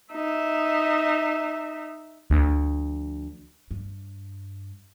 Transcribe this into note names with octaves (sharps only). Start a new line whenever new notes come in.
D#4 E5
D2 F3
G2